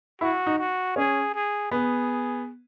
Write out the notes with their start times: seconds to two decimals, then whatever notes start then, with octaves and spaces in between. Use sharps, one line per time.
0.21 E4 F#4
0.47 D#4
0.59 F#4
0.96 C#4 G#4
1.34 G#4
1.71 B3 G#4